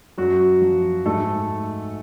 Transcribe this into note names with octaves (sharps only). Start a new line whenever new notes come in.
F#2 F#3 F#4
F3
G#2 A3 A4